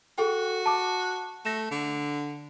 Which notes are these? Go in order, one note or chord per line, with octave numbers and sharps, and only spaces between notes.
F#4 G#4 A4 G5
A5 D6
A3 A#6 E7
D3